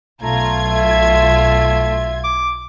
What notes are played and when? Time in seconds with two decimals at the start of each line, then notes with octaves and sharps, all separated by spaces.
0.22 B1 A3 F4 A#5 G#6
0.71 E5
2.24 D6